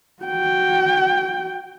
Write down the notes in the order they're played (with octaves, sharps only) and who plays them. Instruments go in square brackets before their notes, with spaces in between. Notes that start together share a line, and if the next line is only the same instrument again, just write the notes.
[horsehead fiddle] F#4 G5